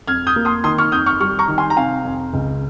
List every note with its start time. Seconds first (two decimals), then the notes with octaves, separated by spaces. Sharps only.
0.08 F2 F6 G#6
0.27 D#6 G6
0.36 A#3
0.45 C6 D#6
0.64 D#3 C6 D#6
0.78 C#6 F6
0.92 F2 D#6 G6
1.06 C#6 F6
1.20 G3 C#6 F6
1.39 A#5 C#6
1.48 D#3
1.58 G#5 C6
1.70 A#5
1.77 C3 F5 G#5
2.05 F2
2.33 C#2